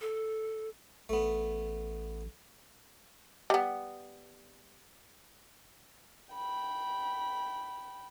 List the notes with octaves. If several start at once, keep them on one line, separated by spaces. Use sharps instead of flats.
A4
A1 A3 B3
G3 B3
G5 B5